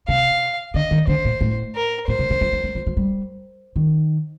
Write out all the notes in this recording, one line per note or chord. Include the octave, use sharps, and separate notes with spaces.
C3 F5
D3 D#5
D#3
D3 C5
A#2
A2
A#4
A#2 C5
C3
C3
F3
F3
G3
F3
F3
G3
D#3